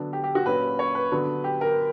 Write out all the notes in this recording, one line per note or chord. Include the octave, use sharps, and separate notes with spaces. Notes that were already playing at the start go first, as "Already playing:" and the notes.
Already playing: D3 F#3 B3 D4
G4
G4
F#4
A#2 F#3 C#4 B4
C#5
B4
D3 F#3 B3 D4
G4
A#4